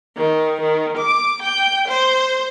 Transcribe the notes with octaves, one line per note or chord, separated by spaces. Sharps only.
D#3
D#3
D6
G5
C5